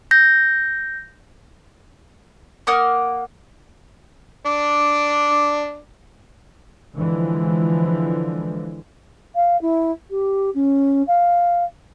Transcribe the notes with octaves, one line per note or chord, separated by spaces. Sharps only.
G6 A#6
A#3 F#5 D#6 F6
D4 D6
D3 E3 F3 G#3
F5
E4
G4
C#4
F5